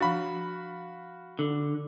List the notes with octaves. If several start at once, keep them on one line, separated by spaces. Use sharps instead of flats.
F3 D4 F#4 F5 B5
D3